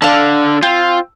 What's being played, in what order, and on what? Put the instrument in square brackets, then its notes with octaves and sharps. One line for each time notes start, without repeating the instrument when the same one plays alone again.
[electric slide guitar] D3 D4 [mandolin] F5 A5
[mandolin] C4 [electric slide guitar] F4